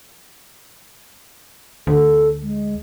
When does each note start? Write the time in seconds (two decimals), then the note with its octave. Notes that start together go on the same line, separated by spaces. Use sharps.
1.87 D2 A4
2.42 G#3